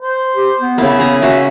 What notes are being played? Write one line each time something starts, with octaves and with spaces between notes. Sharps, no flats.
C5
G4
B3
C#3 A#3 E4
G#4 A#5
A#3 C#4 F#4 E5